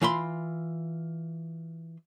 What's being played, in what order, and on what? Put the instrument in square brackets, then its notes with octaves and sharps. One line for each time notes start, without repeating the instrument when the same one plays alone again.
[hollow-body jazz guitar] E3 F4 B5 C6